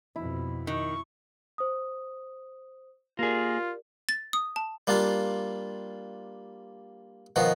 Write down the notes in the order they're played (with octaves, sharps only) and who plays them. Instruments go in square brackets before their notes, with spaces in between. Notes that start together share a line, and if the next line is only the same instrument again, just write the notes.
[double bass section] F2 B2 [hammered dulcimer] E4
[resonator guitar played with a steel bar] D#3 [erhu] C#6
[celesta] C5 D#6
[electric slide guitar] A#3 G#4 [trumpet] F4 [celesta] G4 A#4 D5
[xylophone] A6
D#6
A5
[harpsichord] G3 A#3 D4 F4
B2 D#3 F3 F#4